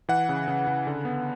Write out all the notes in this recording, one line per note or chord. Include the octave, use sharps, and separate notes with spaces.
E3 F#5
C#3
C#3
C#3
D3
B3